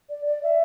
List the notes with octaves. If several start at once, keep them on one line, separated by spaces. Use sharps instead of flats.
D5
D5
E5